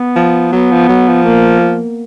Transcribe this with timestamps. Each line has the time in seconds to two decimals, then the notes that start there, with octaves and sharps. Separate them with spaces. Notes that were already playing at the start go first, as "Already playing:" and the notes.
Already playing: B3
0.16 F3
0.52 F#3 B3
0.72 F3
0.89 F#3
1.08 F3
1.25 A#3